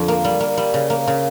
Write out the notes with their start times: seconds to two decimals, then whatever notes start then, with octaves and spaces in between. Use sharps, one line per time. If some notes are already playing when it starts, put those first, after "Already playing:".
Already playing: F2 D3 F3
0.08 A#3
0.25 G3
0.40 A#3
0.58 G3
0.74 C#3
0.90 A#3
1.07 C#3